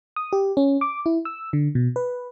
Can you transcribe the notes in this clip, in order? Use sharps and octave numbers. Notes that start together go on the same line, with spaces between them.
D#6
G4
C#4
D6
E4
E6
D3
B2
B4